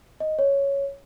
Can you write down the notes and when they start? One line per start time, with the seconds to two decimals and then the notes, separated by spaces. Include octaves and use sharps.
0.20 D#5
0.39 C#5